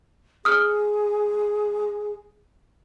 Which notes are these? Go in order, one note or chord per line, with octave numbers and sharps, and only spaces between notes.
G#4 D#6 F6